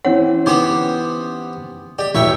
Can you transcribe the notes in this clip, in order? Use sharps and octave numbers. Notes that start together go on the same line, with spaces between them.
E3 C4 C#4 C#5 F#5
B3 D#4 G4 C5 D6
G4 D5
E1 A1 E3 C#5 E5 G5